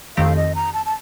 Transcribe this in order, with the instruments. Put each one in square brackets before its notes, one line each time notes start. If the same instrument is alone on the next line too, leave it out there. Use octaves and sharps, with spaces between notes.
[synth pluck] F2 D#3 A3 C4 G4 [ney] F5
[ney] D#5
A#5
A5
A5